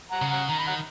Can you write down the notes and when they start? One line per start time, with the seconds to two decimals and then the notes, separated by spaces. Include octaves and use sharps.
0.11 F#5 A#5
0.22 C#3
0.30 F#5 A#5
0.49 D#3 A#5
0.59 B5
0.67 F#5 A#5